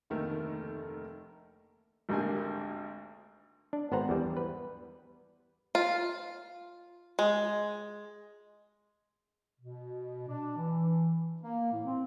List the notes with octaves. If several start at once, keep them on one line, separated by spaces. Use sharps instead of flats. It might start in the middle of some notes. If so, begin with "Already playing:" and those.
F1 D2 D#3 A3 A#3 A#4
G#1 D2 G3 A#3 D4 G#5
D4
G#1 B3 C5 F#5 A#5
E2 G3
B4
F4
G#3
B2
D4
E3
A#3
A2
C4